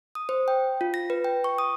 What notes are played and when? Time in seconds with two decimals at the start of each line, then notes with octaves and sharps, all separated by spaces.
0.15 D#6
0.29 C5
0.48 G5
0.81 F4
0.94 A#6
1.10 B4
1.24 G5
1.44 C#6
1.58 D#6